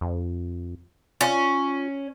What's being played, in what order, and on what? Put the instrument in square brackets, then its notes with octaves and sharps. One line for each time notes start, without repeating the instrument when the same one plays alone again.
[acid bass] F2
[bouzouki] C#4 [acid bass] F4